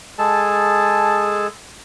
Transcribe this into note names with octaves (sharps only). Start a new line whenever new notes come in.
G#3 G#4 A4 A5